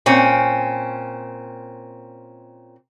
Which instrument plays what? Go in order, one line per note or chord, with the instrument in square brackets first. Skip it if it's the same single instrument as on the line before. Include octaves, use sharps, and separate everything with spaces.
[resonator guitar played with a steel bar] A#2 C4 C#4